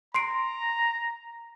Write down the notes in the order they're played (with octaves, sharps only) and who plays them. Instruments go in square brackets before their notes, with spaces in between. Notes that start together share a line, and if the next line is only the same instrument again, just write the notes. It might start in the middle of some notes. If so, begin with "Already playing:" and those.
[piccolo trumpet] A#5 [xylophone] C6 C7 D7